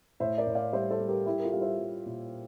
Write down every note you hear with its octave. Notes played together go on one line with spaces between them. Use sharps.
A2 C5 E5
A#4 D5
A2
D5 F5
G3 C5 E5
A4 C5
G3
G4 A#4
G3 E4 G4
A#4
F4 A4
G3 F5
C5 E5
G3
A#2